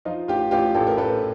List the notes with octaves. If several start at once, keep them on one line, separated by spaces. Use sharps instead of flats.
F3 D#4 F4
A1 F4 G4
A1 F4 G4
A1 G4 A4
A#4
A1 A4 B4